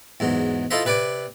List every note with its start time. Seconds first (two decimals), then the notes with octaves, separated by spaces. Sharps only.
0.20 E2 G#2 F#3
0.71 E4 F4 A4 C5 D#5 E5
0.85 C3 B4 D5 G#5 D6